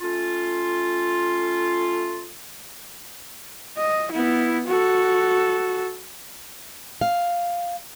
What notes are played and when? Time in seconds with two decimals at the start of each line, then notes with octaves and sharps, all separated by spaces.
0.01 A3 C#4 F4
3.77 D#5
4.12 B3 E4
4.67 F#4 A4
7.01 F5